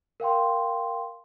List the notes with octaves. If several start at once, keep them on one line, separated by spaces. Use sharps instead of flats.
A#4 F5 G5 C6